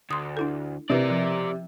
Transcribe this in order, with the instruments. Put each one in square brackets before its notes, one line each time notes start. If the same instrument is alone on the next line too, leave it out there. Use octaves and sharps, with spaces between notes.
[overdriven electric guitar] D2 [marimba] C6 D#6
[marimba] D4 E4 A4
[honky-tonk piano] C3 [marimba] C4 E4 B4 [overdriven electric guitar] A#4 D5
[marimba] F3